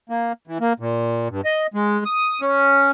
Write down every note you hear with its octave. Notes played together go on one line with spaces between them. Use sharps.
A#3
E3
A#3
A#2
G2
D#5
G#3
D#6
C#4